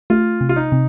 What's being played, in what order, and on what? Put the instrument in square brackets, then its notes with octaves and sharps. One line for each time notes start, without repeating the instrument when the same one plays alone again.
[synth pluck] A3 [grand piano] F4
[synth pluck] C3
[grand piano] F4
D#4
[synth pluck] C3